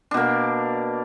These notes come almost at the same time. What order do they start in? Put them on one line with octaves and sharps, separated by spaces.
D4 B2 A#3